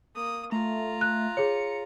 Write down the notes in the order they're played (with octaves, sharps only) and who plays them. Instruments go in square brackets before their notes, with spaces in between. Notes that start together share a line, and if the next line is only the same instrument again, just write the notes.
[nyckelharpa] A#3 D#6
[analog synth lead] A3 [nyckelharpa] F4 A#5
[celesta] F#6
[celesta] G#4 C#5 [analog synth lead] C#7